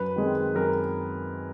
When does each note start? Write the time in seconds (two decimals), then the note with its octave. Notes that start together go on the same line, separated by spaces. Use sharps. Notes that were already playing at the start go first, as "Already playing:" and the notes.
Already playing: F#2 B4
0.16 D#3 G#3 C4
0.55 F#2 A#4